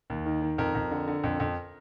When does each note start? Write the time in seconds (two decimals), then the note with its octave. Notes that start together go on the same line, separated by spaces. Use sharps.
0.10 D#2
0.26 D#3
0.42 D#3
0.58 F2 A#4
0.75 F2
0.91 D3
1.08 D3
1.24 F2
1.40 F2